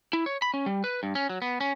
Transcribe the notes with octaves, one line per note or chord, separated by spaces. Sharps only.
E4
C#5
B5
C#4
G3
B4
G2
C#4
F#3
B3
C#4